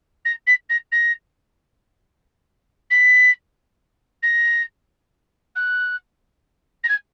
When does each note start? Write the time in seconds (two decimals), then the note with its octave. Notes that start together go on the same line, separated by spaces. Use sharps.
0.25 A#6
0.47 B6
0.69 A#6
0.92 A#6
2.90 B6
4.23 A#6
5.55 F#6
6.84 A#6
6.89 G#6